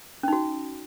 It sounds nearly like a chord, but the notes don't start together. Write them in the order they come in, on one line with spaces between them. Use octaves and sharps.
C#4 D#4 F#4